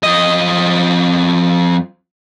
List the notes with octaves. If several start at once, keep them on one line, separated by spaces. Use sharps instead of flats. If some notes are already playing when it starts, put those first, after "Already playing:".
F2 D#5